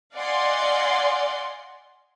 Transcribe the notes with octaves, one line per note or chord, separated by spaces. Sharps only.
D5 D#5 F5 F#5 G#5 C6